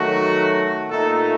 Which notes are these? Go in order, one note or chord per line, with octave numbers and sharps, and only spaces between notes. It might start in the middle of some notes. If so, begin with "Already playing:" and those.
Already playing: D#3 F#3 A3 F#4
A#2 A3 D#4 A4